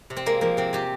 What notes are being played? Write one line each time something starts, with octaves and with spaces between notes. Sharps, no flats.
C3
C4
G#3 A#3
F3 A#3
C3 C4
C3 G4